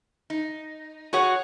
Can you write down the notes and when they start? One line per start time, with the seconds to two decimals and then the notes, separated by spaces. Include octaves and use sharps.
0.30 D#4
1.13 F#4 G#4 C#5 F#5